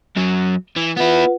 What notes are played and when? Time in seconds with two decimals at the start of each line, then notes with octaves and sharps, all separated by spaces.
0.17 F#2 F#3
0.77 E3
0.97 B3 E4 F4 B4 F#5